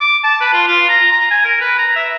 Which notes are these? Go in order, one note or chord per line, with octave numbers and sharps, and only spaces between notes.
D6
A5
B4
F4
F4
A#5
A#5
G#5
A#4
B4
A#5
E5